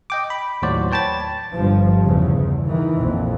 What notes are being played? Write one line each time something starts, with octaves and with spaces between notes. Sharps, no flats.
D#5 G5 D6
B5
D#2 A2 F#3 F#4 C5 D5
B4 C#5 G5 A5 B5 A6
G1 G2 F3
E2 C#3
E2
D#3 E3
A#1 F2